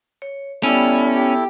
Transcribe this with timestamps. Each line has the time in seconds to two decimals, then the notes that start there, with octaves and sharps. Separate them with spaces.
0.22 C#5
0.63 G3 B3 C#4 E4 A4
1.14 G4